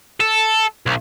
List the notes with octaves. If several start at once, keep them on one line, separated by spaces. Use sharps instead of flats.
A4
B1